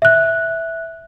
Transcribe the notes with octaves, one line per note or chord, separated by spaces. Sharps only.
E5 F#6